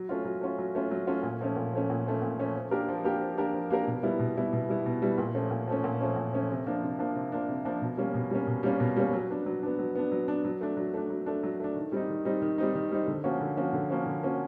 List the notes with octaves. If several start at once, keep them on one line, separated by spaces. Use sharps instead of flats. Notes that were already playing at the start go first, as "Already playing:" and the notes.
Already playing: F#3
A3 C#4 F4
F#3
A3 C#4 F4
F#3
A3 C#4 F4
F#3
A3 C#4 F4
A#2
F3 A3 C#4
A#2
F3 A3 C#4
A#2
F3 A3 C#4
A#2
F3 A3 C#4
F3
A#3 D4 G4 A#4
F3
A#3 D4 G4 A#4
F3
A#3 D4 G4 A#4
F3
A#3 D4 G4 A#4
B2
G3 B3 E4
B2
G3 B3 E4
B2
G3 B3 E4
B2
G3 B3 E4
A#2
F3 A3 C#4
A#2
F3 A3 C#4
A#2
F3 A3 C#4
A#2
F3 A3 C#4
C3
F3 A#3 D4
C3
F3 A#3 D4
C3
F3 A#3 D4
C3
F3 A#3 D4
B2
G3 A#3 C#4
B2
G3 A#3 C#4
B2
G3 A#3 C#4
B2
G3 A#3 C#4
F#3
B3 D4
F#3
B3 D4
F#3
B3 D4
F#3
B3 D4
F#3
A3 D4
F#3
A3 D4
F#3
A3 D4
F#3
A3 D4
D#3
G3 C4 D#4
D#3
G3 C4 D#4
D#3
G3 C4 D#4
D#3
G3 C4 D#4
D3
F3 A#3 C#4 F#4
D3
F3 A#3 C#4 F#4
D3
F3 A#3 C#4 F#4
D3
F3 A#3 C#4 F#4